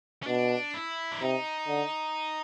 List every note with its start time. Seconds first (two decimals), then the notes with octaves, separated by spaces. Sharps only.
0.23 C#4
0.27 B2 D4
0.74 E4
1.12 D4
1.21 C3 D#4
1.68 D3